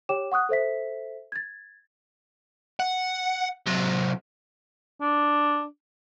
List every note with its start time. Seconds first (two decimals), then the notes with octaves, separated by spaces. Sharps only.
0.09 G4 C#5 G5 D6 E7
0.32 F#5 C#6 D#6 F#6
0.49 A4 C5 E5 B6
1.32 G#6 A6
2.80 F#5
3.66 C3 F#3
5.01 D4